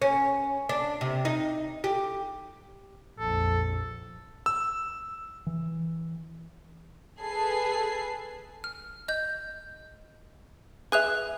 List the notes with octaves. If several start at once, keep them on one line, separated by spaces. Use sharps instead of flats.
C#4
D4
C3
D#4
G4
A#1 F2 A4
E6
E3
G#4 A4 B4 C7
F6
D#5 G6
G#4 B4 E5 F#6 F7